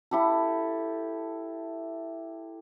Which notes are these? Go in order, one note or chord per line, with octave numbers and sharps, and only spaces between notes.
E4 G4 A4